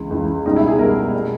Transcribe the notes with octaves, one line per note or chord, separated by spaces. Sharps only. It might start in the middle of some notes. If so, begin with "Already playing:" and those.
Already playing: C#2 C#3 E3
C#2 C#3 E3
C#2 B2 G3 D#4
E4
G#4
C#2 B2 G3 A#4
B2 G3